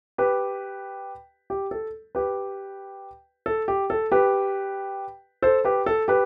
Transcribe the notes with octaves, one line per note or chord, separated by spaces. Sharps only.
G4 B4
G4
A4
G4 B4
A4
G4
A4
G4 B4
A4 C5
G4 B4
A4
G4 B4